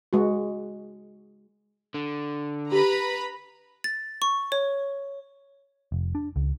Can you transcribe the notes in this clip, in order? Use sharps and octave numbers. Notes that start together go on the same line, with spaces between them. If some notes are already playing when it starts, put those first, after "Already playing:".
G#3 F#4
D3
G4 B4 A#5 B5
A6
C#6
C#5
F1
D4
C#2